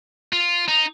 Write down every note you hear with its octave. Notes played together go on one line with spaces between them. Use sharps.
F4
D#4